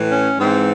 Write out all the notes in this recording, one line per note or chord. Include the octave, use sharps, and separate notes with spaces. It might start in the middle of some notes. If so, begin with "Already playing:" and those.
Already playing: A2 E3
C#4
G#2 E3 C4